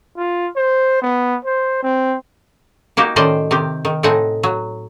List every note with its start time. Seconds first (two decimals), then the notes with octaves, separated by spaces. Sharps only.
0.17 F4
0.56 C5
1.02 B3
1.45 C5
1.83 C4
2.97 A#3 D#4 F#4 G4
3.16 A2 D#3 C#4 C5 D5 D#5
3.51 C3 D#3 G4
3.85 D#3
4.03 A2 C4 D#4 F#5 G#5
4.43 F#3